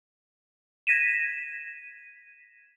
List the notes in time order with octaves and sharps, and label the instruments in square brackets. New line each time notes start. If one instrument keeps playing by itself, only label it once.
[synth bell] G#6 A#6 B6 D#7 E7